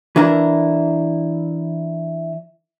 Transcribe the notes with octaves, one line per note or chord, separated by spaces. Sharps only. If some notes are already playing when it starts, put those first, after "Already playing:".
E3 D4 E4 A#4